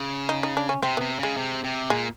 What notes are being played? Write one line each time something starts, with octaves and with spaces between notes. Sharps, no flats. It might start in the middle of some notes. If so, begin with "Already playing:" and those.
Already playing: C#3
D#4
D#4
D4
C#4
C3 C4
C3 B3
C#3 G#3
C3
C3
A#2 G#3